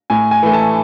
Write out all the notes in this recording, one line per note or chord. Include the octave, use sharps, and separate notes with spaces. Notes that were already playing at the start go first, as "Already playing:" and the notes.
A2 G#5
G#5
E3 A3
A5